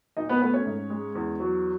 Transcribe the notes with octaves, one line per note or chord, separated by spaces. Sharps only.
A#2 D#4 D#5
B3 B4
A3 B3 B4
C#4 C#5
G#2
G#3
E2
F#3